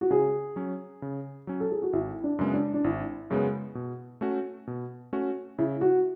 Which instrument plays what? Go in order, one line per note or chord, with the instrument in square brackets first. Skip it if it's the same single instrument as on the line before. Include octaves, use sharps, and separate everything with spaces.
[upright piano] F#4
[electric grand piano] C#3 [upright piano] G#4
[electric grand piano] F#3 C#4
C#3
F#3 C#4
[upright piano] A4
G#4
F#4
[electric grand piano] G#1 [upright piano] E4
[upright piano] D4
[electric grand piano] F#2 C#3 G#3 B3
[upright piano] D4
D4
[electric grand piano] G#1 [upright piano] E4
[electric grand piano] F#2 C#3 G#3 B3
B2
A3 C#4 F#4
B2
A3 C#4 F#4
[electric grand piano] C#3 [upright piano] E4
[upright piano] F#4